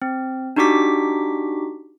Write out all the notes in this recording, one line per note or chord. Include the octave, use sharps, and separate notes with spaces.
C4
D4 D#4 F#4 G4 D6 B6